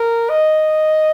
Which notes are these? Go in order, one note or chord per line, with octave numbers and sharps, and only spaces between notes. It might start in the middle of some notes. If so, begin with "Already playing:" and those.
Already playing: A#4
D#5